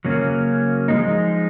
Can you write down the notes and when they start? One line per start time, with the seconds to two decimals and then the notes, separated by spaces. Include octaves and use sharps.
0.05 C#3 F#3 A#3 C#4
0.88 F3 G#3 D#4